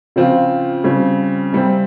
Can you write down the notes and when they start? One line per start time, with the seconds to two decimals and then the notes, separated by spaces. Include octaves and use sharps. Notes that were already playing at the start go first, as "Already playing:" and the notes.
0.16 C#3 F3 C4 F4
0.84 C#3 G3 C4
1.53 C3 G3 C4